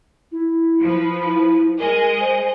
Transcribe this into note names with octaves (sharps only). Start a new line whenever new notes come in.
E4
F3 B4
E4
G#3 G#4 A#4 D#5
C5